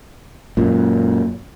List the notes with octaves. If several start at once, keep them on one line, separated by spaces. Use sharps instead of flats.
F#2 A#2